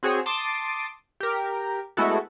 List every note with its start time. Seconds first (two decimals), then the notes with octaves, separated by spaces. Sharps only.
0.03 C4 F#4 G#4 C5 C#5
0.26 A5 C6 D6 D#6
1.20 G4 A#4
1.97 G#3 A3 B3 E4 F#4 A4